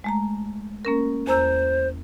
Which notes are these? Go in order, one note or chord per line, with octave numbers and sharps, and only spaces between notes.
G#3 A3 A#5
A#3 C#4 A#4
E2 C5 A#5 E6